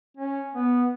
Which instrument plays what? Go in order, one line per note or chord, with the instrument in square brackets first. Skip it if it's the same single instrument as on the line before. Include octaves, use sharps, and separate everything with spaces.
[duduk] C#4
B3